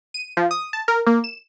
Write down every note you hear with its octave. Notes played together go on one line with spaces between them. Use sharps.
D#7
F3
D#6
A5
A#4
A#3
E7